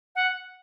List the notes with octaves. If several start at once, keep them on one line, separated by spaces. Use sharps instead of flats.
F#5